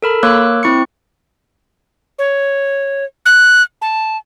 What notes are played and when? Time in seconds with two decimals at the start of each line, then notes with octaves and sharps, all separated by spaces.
0.02 A4 A#4 B5
0.23 A#3 A#4 C#5 D6 E6 F#6
0.63 C4 E4 C#6 C#7
2.19 C#5
3.26 F#6
3.82 A5